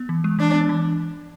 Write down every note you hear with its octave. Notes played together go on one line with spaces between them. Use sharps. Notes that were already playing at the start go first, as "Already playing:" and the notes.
Already playing: B3
E3
G#3
E3 D4
B3
E3